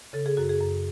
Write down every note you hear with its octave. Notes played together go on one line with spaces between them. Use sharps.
C#3 A4
G#4
F#2 F#4
G#4
F#2